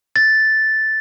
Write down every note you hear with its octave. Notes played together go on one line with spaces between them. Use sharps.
A6